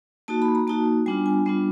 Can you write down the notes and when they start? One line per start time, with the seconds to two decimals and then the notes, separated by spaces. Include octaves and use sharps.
0.28 A#3 D#4 F#4 A5
0.42 B5
0.55 A#5
0.67 A#3 D#4 F#4 A5
1.06 G3 B3 D4 F4 G#5
1.26 G#5
1.46 G3 B3 D4 F4